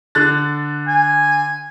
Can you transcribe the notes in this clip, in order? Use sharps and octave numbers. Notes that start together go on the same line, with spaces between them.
D3 F#6 A6
G#5